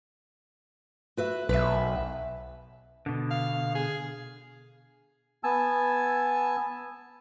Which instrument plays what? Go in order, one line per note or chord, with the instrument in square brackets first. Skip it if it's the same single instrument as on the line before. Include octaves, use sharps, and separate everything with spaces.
[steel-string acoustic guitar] F#4 B4 E5
[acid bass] B1 [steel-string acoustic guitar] B4 E5
[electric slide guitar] B2 D3
[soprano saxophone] F5
G#4
[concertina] B3 G#5 A5 E6